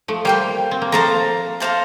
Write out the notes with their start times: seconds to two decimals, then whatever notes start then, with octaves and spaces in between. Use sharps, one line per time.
0.08 F3 A3
0.25 G3 A#3 C5 G5 C6
0.71 C4
0.82 A#3
0.92 F3 A3 A4 C5 F5 A#5
1.60 A4 C5 F5 A#5